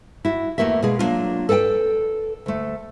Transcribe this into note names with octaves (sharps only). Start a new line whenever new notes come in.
E4 F#4
E2 D3 A3 A#3 F#4 E5
B2 G#3 G#4 F5
F#3 A#3 D4 F4
A4 B4 D5 F#5 G5
D2 A3